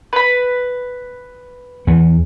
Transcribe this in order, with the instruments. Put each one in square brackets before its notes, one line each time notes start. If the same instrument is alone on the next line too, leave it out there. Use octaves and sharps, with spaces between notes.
[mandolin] B4 B5
[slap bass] E2 E3 B3